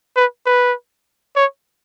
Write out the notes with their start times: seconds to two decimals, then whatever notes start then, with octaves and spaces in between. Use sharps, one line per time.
0.16 B4
0.46 B4
1.36 C#5